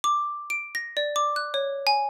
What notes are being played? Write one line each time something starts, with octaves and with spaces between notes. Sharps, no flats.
D6
D7
A#6
D5
D6
F#6
C#5
G#5